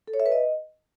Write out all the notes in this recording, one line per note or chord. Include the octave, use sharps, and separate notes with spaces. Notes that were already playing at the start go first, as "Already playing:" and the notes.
A4
C#5
E5
B4
D#5